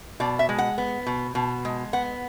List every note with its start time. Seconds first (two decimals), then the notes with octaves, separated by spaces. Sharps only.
0.20 B2 D5
0.39 E5
0.49 G#3
0.58 F#5
0.78 B3
1.06 B2
1.35 B2
1.65 G#3
1.93 B3 F#5